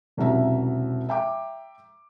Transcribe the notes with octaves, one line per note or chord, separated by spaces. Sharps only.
E1 C2 F#3 C#4 E5 A#5
E5 G5 A#5 D6